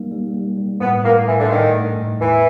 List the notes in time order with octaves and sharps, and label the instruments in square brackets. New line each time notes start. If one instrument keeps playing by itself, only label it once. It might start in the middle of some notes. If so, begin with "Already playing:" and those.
Already playing: [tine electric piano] G3 A#3 D#4
G3
G3
G3
[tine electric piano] A2 [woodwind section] B3
[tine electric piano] A2 [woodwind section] A#3
[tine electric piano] A2 [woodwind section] E3
[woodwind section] D3
[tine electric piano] A2 [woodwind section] D#3
[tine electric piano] A3
A2
[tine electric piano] E2 [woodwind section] E3